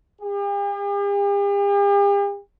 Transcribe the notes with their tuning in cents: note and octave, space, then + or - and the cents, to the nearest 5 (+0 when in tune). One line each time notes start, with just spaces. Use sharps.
G4 +45